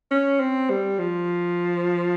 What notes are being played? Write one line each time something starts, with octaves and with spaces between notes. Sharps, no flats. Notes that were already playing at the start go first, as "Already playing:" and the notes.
C#4
C4
G3
F3